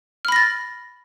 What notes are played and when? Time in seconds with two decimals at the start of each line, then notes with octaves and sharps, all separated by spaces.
0.25 F6
0.28 B5
0.32 A#6
0.36 A6